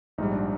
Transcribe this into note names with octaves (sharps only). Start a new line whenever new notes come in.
A#1 G#2 G3 D#4
D4